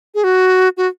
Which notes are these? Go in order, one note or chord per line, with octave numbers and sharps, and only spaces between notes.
G#4
F#4
F#4